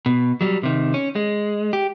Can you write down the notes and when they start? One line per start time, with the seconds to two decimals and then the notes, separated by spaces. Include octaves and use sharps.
0.06 B2
0.41 F#3 G3
0.63 C3 D#3
0.94 C#4
1.15 G#3
1.73 G4